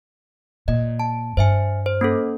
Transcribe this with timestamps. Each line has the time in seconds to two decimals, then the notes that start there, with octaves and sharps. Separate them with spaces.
0.68 A#2 D#5
0.99 A5
1.37 G2 C5 E5 G#5
1.86 C5
2.01 A#3 C#4 A4